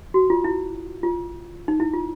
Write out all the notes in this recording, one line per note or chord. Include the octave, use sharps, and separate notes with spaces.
F#4
F4
E4
F4
D#4
E4
F4